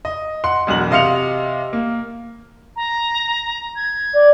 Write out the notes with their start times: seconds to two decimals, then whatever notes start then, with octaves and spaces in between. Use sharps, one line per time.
0.05 D#5
0.44 F#5 C6
0.67 E1 B1 F#4 F#7
0.91 C3 D#5 F5 C6 C#7 F7
1.73 A#3
2.76 A#5
3.76 G#6
4.14 D5